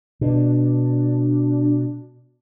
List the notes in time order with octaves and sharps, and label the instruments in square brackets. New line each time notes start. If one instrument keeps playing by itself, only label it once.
[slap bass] B2 [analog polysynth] D4